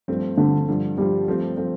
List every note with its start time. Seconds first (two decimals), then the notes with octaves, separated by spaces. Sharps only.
0.08 G2 F3 A3 C4
0.37 G2 D3 F3 A3 C4
0.68 G2 D3 F3
0.98 G2 D3 F3 G3
1.27 G2 F3 A3 C4
1.57 F3 A3 C4